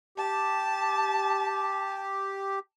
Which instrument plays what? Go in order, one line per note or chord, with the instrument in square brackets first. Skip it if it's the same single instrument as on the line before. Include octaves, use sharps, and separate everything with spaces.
[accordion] G4 [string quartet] A5